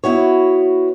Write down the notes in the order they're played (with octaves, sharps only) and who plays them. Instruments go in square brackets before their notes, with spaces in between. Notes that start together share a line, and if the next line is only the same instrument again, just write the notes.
[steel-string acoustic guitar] B3 E4 F#4 C#5